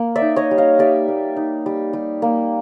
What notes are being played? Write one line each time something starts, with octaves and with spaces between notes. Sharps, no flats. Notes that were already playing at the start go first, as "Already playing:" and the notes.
Already playing: A#3
D5 E5
D#4
C#5 D#5
G3
D#5 F5
G3 D5 E5
A#3
D#4
G3
G3
A#3